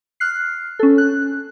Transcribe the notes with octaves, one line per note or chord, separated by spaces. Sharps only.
F6 F#6 C7
C#4 A4
F#6